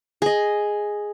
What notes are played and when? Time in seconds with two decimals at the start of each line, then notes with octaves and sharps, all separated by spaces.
0.22 G#4 D#5